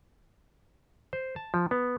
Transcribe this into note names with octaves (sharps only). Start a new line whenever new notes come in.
C5
A5
F3
B3